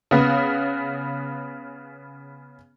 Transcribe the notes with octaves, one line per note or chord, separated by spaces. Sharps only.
C#3 B3